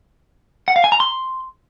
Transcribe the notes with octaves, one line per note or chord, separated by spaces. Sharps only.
F#5
F5
G#5
A#5
C6